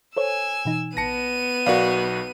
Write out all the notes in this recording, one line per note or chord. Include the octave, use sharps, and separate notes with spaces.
A4 C5 C#5 G#5 E6
B2 E3 D#4
A1 B3 A5 A#6 C#7 D#7
B1 F#4 A#4 D5 F5